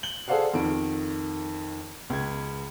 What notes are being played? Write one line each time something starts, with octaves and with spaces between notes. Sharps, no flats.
F#7 G7
G#4 A4 C5 D5 F5 F#5
F2 D#3 D7
C#2 G#6